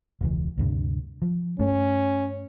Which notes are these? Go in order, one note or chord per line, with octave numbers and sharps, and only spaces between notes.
E1 C#2 E3
D2 G2 C3
F3
G2 A3 C#4